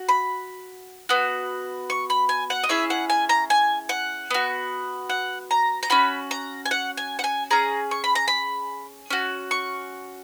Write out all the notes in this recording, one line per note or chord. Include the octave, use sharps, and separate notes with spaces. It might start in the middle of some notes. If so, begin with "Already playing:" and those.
Already playing: F#4
B5
B3 F#4
C#6
B5
G#5
F#5
D#5
C#4 E4 G#4 E5
F#5
G#5
A#5
G#5
F#5
B3 F#4
F#5
A#5
A#5
C#4 F#4 B5
A#5
G#5
F#5
G#5
F#5
G#5
C#4 G#4 A#5
C#6
B5
A#5
B5
C#4 F#4
C#6